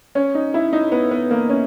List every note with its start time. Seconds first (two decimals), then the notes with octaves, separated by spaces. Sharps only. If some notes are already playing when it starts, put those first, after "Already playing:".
0.15 C#4
0.35 D#4
0.54 E4
0.73 D#4
0.92 B3
1.11 B3
1.31 A#3
1.49 C#4